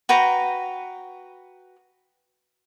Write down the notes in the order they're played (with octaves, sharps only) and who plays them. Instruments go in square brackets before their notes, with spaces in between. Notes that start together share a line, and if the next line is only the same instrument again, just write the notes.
[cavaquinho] F#4 B4 G5 A#5